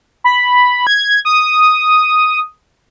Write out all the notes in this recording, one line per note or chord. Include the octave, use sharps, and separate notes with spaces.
B5
G#6
D#6